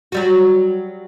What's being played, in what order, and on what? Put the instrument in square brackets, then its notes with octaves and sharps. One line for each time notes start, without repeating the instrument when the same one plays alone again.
[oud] F#3 G3 F#4